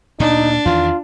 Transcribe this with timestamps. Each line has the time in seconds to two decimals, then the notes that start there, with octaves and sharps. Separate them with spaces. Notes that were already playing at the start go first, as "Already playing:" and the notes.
0.20 D2 A#2 D4 D#4
0.65 E2 D#3 E3 F4